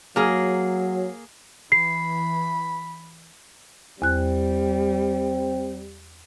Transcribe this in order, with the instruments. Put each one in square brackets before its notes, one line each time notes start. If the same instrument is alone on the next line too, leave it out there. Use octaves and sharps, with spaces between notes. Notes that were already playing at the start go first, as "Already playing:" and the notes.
[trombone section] F#3 [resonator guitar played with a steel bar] A#3 G#4
[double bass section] E3 [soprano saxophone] B5 [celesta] C7
[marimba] E2 F#6 [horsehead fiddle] G3 [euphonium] C4